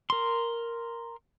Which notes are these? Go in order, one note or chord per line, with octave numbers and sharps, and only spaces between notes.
A#4 C6